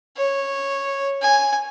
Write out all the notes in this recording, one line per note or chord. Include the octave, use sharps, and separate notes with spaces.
C#5
G#5